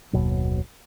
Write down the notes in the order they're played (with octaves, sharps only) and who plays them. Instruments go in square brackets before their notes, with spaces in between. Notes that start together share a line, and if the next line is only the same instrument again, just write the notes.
[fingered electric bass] F#1 D#2 B2 F#3